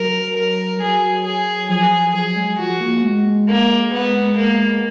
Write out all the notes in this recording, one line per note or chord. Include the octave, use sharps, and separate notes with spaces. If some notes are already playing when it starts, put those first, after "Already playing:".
Already playing: F#3 A#4
A#4
F#3 G#4
G#4
F3 G#4
F#3 G#4
G#3
F3 F#4
A#3
G#3
A#3
B3
A#3